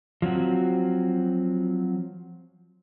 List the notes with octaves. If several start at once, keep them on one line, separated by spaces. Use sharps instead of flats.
F3 F#3 C4 F#4